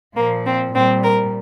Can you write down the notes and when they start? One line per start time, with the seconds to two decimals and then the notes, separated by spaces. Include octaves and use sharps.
0.15 A#2 F3 A#3
0.45 C4
0.73 A#2 G3 C4
1.03 A#4